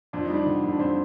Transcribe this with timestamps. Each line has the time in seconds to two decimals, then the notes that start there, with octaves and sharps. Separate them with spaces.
0.13 F2 D4
0.25 G3 D#4
0.36 D4
0.46 D3
0.63 F2
0.72 D4
0.79 F2 C4